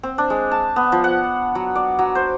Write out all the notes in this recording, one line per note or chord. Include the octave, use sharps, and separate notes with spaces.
C4
D4
G#3
A5
B3
F3
F#5
F#3
D5
F#3
C5